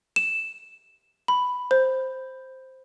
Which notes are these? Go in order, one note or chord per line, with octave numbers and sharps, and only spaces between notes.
E7
B5
C5